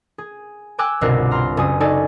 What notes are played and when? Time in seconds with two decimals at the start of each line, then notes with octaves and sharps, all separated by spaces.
0.18 G#4
0.78 G5 G#5 D6 E6 F#6
1.01 G1 C2 B2 F4 A#4 F#6
1.31 A#5 C6 F6
1.57 F#1 G#5 D#6
1.80 D#4 A4 D5 G#5 C#6